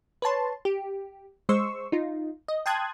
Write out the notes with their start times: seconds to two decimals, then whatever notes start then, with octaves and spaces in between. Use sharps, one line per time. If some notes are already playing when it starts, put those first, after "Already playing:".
0.22 B4 C#5 A5 C6
0.65 G4
1.49 G#3 C5 C6 C#6 E6
1.92 D#4 F4
2.48 D#5
2.66 G5 A5 C6 D#6 F#6 G#6